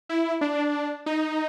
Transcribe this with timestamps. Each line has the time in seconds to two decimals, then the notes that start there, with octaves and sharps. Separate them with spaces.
0.09 E4
0.41 D4
1.06 D#4